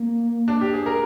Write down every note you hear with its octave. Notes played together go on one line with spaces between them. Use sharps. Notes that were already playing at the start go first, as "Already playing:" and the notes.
Already playing: A#3
D4
G4
G#4
A#4